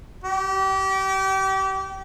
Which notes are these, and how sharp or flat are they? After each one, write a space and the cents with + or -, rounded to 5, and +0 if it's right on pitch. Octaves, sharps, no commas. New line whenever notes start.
G4 -30